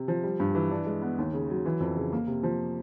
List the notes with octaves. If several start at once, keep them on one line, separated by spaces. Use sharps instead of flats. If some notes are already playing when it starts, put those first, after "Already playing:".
Already playing: C3
F3
G3
G2
E3
D4
G#3
B3
D#2
C#3
F#3
E3
F2
C#3
A#3
C3
F3